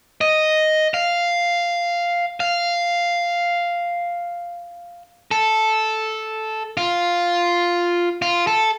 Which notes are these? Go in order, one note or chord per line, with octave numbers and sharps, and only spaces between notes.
D#5
F5
F5
A4
F4
F4
A4